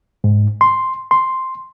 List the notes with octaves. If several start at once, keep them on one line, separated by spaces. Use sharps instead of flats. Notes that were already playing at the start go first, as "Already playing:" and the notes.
G#2
C6
C6